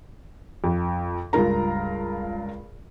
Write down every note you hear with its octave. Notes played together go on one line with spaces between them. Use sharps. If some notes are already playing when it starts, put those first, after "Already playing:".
F2
C#2 G2 F4 A#4 A#5